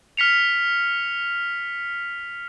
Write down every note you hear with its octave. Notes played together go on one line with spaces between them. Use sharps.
F6 B6 C#7 F7